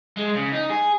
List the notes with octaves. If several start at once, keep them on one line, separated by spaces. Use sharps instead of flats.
G#3
C#3
D#4
G#4